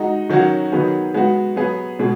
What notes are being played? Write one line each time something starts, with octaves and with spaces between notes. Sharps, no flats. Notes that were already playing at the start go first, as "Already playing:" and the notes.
Already playing: G#3 D#4 F#4
D#3 F#3 C#4 F#4
D#3 F#3 B3 G#4
G#3 B3 F#4
F#3 B3 G#4
B2 G#3 G#4